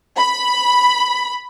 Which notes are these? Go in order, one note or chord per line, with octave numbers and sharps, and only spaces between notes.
B5